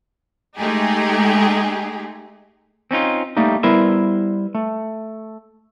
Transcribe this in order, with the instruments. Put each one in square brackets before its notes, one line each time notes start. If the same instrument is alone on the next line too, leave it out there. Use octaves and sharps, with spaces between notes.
[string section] G#3 A3 D#4 G4 G#4
[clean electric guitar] C4 C#4 D#4 F4
G3 A3 A#3 D#4
G3 B3 E4 A#4 C5 E5
A3